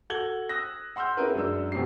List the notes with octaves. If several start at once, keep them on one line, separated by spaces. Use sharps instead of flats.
F#4 A4 G#6 F#7 G7
D#6 E6 F#6 A#6
F#5 C6 E6 F6 G6
C4 C#4 E4 G#4 A#4 B4
F#2 G#3 D4 E6
F2 B2 F#3 G4 C7